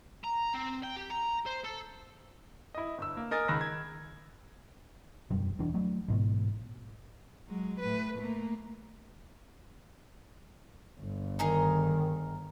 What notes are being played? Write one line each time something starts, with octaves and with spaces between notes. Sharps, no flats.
A#5
C4
G5
G4
A#5
C5
A4
E4 D#5
G1 E6
A#3
A#4 D#5 G#5 A6
C#2 D#3 B5 E6 F#6 A#6
G#6
E1 F#2 G3
E1 E2 E3 D4
F#3 A3
A1 G#2 B2
F#3 G#3
A2 B4
A3 A#3
G1
D#3 D#4 G#4 A#4